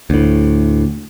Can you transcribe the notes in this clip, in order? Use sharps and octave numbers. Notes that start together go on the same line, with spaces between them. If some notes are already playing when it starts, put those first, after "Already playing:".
D2 A2